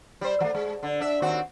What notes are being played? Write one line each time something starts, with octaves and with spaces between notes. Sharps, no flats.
G3 C5
F3 A3
G#3
D3
D4 E5
D#2 C4 F#4